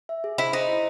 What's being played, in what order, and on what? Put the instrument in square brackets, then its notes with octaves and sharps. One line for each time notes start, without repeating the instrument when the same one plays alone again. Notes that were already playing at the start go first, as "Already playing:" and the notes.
[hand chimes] E5
G#4
[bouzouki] E4 [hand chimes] C5
[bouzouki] D#4 [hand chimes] C5
[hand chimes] E4